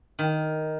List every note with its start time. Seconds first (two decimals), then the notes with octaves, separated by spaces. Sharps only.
0.19 D#3